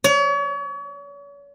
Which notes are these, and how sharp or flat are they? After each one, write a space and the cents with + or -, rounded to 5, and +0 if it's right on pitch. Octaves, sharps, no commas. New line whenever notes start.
C#5 +40